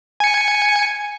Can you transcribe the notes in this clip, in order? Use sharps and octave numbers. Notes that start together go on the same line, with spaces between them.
G#5 C#7